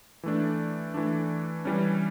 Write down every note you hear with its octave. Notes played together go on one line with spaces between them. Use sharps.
E3 A3 D4
E3 A3 D4
E3 G3 C#4